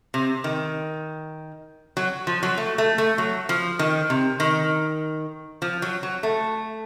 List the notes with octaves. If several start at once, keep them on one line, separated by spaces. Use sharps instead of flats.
C3
D#3
F#3
F3
F#3
A3
A3
A3
F#3
F3
D#3
C3
D#3
F3
F#3
F#3
A3